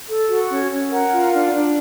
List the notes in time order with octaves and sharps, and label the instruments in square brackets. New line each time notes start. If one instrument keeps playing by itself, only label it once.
[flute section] A4
F#4
C#4
C#4
A#4 F#5
F4
D4
D4